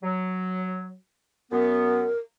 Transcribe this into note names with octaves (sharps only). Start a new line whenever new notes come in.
F#3
F#2 B3 A#4